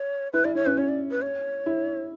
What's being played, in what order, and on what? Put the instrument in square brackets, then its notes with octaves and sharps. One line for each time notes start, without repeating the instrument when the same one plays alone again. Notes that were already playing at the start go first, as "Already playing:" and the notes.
Already playing: [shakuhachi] C#5
[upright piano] E4 [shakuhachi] B4
[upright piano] E4 [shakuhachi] D5
[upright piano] E4 [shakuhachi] C#5
[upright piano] C#4 [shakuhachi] B4
[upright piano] C#4 [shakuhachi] C#5
[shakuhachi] D5
B4
C#5
[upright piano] E4